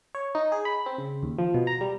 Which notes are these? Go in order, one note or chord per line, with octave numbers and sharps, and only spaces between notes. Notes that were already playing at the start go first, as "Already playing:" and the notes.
C#5
D#4
G#4
B5
C4
C#3
D#2
F3
B2
A#5
G3